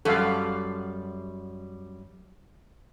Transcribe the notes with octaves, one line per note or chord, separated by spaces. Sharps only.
F#2 G3 A4 F5